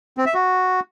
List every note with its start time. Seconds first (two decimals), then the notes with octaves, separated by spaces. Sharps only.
0.18 C4
0.26 E5
0.34 F#4